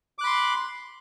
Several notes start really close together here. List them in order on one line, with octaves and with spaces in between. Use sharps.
D6 F#6 B5 C6